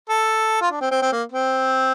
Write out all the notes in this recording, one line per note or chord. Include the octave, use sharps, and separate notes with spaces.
A4
F4
D4
C4
C4
C4
A#3
C4